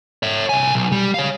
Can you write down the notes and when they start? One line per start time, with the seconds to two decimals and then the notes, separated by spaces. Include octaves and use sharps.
0.23 C#5 E5
0.49 C2 G#5
0.74 B1
0.92 G3
1.14 C#5 F5